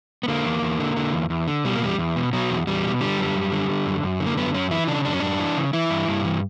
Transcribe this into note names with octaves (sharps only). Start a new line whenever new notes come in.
B3
D3 A#3
E2
E2
D3
D3
E2
E2
D3
B2 G3
A#3
E2 G3
E2
B2
B2 F#3
E2
E2 G3
B2
D3 G3
F#2
F#2
D3
D3
F#2
F#2
D3
A#3
F#2 B3
F#2 C#4
E3 E4
C#3 D4
F#2 D4
C#4
F#2 D4
E3
C#3
E3 E4
G2
G2
E3